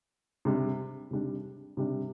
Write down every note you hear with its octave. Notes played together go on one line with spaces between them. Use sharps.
C3 G3 D4
C3 G3 D4
C3 G3 D4